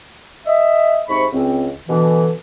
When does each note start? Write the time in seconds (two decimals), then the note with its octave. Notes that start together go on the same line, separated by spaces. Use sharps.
0.46 D#5 E5
1.08 G#2 C3 B5 C#6
1.32 C#2 C4
1.88 B2 D3 E3